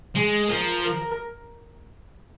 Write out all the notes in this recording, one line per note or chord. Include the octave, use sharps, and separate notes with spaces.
G#3 G#4
F3 A#4
A#4